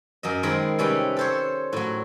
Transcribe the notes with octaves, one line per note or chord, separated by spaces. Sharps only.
F#2 D#5
D#3 G#3 C4 A#4 D#5 B5
C3 G3 C#4 B4 G5
A4 C5 C#5
A2 F#3